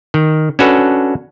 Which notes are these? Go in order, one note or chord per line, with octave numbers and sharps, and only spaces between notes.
D#3
C#4 D4 F#4 A4 B4